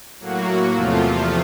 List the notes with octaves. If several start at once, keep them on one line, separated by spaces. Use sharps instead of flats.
A2 F#3 A#3 F#4
E2 C3 F3 A3 F4